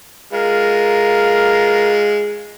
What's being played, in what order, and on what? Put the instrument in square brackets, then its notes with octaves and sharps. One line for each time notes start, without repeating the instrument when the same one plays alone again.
[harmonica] G#3 F4 [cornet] A#4